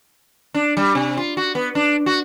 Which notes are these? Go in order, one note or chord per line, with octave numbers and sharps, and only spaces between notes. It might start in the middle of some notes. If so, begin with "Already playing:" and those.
D4
G3
C3
F4
F#4
B3
D4
F#4